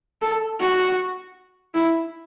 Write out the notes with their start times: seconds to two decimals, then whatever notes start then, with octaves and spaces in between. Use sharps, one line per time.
0.22 A4
0.60 F#4
1.75 E4